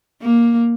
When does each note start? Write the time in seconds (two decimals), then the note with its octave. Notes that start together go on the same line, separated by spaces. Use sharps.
0.21 A#3